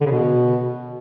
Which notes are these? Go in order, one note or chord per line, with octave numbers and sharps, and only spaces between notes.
D3
C#3
B2